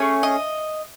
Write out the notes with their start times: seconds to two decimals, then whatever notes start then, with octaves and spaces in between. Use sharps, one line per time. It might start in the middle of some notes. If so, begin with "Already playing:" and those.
Already playing: A3 C#4 G#4
0.23 D#5